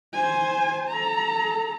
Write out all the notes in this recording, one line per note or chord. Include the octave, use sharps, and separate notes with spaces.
C5 G#5
A4 A#5